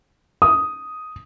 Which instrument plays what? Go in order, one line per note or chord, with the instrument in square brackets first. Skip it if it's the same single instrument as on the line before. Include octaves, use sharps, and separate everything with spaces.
[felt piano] D#6